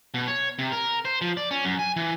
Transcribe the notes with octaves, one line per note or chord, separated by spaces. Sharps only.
B2
C#5
C3
A#4
C5
F3
D5
C#4
F#2
G#5
E3